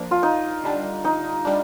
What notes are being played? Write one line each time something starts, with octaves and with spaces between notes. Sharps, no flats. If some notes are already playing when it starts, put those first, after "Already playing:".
Already playing: F3 A#3 D4
F4
D#4
D3 G3 D4
D#4
G3 D4